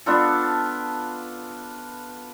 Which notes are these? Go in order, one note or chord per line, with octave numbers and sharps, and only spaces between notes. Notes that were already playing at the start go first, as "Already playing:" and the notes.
B3 D4 F4 A4